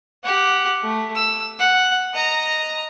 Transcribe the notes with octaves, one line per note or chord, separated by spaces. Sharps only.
G4 F#5
A3
E6
F#5
D#5 A#5